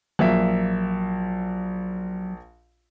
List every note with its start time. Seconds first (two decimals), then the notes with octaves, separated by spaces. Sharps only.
0.19 A#1 F#3 A#3 E5